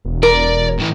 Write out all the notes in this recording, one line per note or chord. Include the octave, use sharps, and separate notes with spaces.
E1
A#4 D5
A2 E3